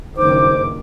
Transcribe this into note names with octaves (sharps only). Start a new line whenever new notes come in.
F#1 G2 D#3 C5 D6